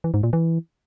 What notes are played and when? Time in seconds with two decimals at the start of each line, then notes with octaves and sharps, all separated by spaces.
0.04 E3
0.14 G#2
0.23 A#2
0.33 E3